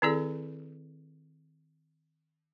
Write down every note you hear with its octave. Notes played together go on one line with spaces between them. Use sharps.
D#3 C4 E4 G#4 A4 D5